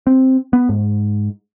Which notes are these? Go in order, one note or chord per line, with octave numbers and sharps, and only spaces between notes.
C4
B3
G#2